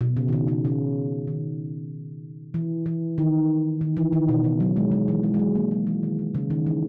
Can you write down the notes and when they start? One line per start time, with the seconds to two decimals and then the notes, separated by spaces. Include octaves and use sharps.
0.01 B2
0.17 C#3
0.28 D#3
0.33 C#3
0.48 C#3
0.65 C#3
1.27 D#3
2.54 E3
2.86 E3
3.18 D#3
3.81 D#3
3.97 E3
4.13 D#3
4.29 B2
4.44 C#3
4.60 F#3
4.76 G#3
4.91 G#3
5.08 E3
5.23 G#3
5.34 G#3
5.39 F#3
5.55 A#3
5.71 F#3
5.87 E3
6.03 D#3
6.19 D#3
6.35 C#3
6.50 D#3
6.66 E3